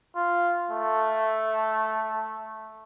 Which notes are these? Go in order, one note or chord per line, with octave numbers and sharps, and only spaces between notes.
F4
A3